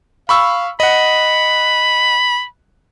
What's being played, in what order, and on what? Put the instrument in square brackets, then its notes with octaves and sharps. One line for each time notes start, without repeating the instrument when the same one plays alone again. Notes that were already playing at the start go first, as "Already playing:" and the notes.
[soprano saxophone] F5 [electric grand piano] B5 C#6 E6
[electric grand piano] D#5 F#5 [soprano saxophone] B5